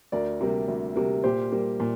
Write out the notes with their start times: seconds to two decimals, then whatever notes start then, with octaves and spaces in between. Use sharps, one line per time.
0.12 D2 A#4 D5
0.41 C3 G3 A#3
0.68 D2
0.96 C3 G3 A#3
1.24 A#2 G4 C5
1.52 G3 A#3
1.80 A#2